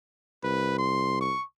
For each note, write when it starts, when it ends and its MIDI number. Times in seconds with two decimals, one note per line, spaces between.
0.44 1.32 36
0.44 0.78 71
0.78 1.17 84
1.21 1.44 85